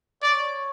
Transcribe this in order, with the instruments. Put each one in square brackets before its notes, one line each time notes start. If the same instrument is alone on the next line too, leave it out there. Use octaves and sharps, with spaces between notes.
[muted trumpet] C#5 [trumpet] D5